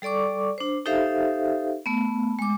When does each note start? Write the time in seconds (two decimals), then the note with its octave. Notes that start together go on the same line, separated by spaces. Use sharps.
0.02 G3 A4 D5 C#6 D6
0.58 D4 C5
0.86 D#4 G4 A4 C5 E5 F5
1.86 A3 B3
2.39 G#3 D6